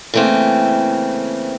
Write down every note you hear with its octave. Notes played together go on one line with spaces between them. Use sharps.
C#3 E3 A3 A#3 C4